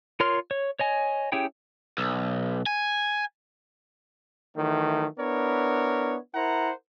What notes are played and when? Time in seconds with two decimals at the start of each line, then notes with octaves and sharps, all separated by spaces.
0.20 F4 A#4 C#5 C6 F6
0.51 C#5
0.79 C#5 D#5 G#5
1.32 C#4 E4 G4 G#4 G5
1.98 B1
2.66 G#5
4.56 D#3 E3 F#3 A3
5.19 B3 D4 E4 A#4 C#5
6.35 E4 A#4 C5 F#5 A#5